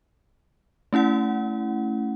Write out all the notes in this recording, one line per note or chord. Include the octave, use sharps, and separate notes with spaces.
A3 C#4 E4 F#5